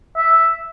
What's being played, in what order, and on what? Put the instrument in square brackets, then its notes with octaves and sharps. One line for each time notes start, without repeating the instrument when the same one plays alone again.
[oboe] E5